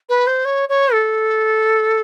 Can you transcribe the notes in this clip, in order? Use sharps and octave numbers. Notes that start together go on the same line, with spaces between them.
B4
C5
C#5
C#5
A4